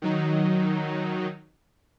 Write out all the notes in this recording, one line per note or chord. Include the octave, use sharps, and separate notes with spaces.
D#3 F#3 D#4